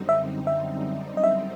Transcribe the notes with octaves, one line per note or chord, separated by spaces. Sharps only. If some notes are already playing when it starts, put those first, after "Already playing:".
Already playing: F#2 D3 G3 C4 D#4
E5
E5
D#5
E5